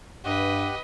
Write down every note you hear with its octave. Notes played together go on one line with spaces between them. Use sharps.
G2 G4 B4 D#5 F#5